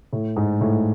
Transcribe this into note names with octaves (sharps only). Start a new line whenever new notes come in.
A2
G#2
A2